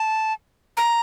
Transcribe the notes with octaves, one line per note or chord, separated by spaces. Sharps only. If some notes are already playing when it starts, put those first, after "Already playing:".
Already playing: A5
A#5